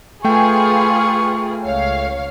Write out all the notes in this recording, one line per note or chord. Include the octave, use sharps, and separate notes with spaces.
A3 F4 G#4 B4 G5 C#6
C#2 C#5 F5